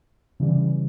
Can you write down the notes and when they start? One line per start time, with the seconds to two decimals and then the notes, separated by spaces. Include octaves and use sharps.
0.40 C#3 E3 G3